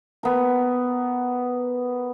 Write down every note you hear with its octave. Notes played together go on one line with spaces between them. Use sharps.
B3 A#4